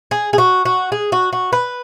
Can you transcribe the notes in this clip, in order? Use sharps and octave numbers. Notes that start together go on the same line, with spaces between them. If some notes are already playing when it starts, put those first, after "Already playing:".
G#4
G#4
F#4
F#4
G#4
F#4
F#4
B4